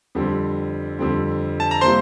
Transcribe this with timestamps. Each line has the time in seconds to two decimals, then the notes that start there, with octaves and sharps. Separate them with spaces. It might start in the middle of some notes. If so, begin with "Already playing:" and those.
0.15 F2 D3 G3 C4
0.99 F2 D3 G3 C4
1.60 A5
1.71 A#5
1.81 C3 G3 A#3 E4 C5 C6